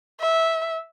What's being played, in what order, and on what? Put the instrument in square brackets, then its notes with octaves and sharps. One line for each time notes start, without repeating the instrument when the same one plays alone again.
[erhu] E5